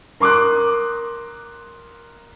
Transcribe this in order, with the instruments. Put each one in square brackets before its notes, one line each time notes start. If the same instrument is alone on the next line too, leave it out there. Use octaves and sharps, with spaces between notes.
[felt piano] A#4 C6 D6 D#6 F#6